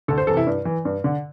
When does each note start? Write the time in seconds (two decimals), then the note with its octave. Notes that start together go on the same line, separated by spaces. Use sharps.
0.08 D2 A4
0.18 C5
0.27 C3 E3 A4
0.37 E4
0.47 G2
0.65 E3
0.85 G2
1.04 D3